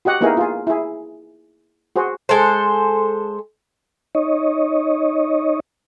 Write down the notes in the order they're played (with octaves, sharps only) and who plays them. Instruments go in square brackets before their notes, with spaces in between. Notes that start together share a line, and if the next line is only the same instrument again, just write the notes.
[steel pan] F#4 G4 D#5 F#5
A#3 B3 D#4 E4 G#4 A#4
F4 G#4
E4 G#4
F#4 G#4 C5
[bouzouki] G#3 A4 C5
[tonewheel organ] D#4 C#5 D#5